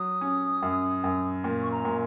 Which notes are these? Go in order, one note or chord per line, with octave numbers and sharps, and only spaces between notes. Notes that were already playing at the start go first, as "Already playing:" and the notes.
Already playing: F#3 D#6
C#4
F#2
F#2
A#2
C#6
A#5
A#2